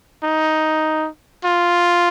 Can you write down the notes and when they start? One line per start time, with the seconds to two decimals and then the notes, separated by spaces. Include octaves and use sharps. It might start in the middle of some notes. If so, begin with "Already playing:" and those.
0.23 D#4
1.44 F4